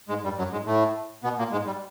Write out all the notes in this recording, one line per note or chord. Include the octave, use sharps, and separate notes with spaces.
G#2 G#3
G2 G3
F#2 F#3
G#2 G#3
A2 A3
B2 B3
A#2 A#3
G#2 G#3
G3